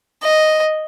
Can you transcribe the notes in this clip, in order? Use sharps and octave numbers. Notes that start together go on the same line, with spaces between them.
D#5